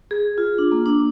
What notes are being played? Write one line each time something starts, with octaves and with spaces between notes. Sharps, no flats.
G#4
F4
D4
A#3
D4